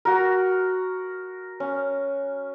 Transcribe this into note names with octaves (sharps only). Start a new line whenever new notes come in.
F#4 A#4
C#4